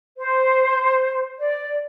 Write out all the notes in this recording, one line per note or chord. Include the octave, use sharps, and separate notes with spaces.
C5
D5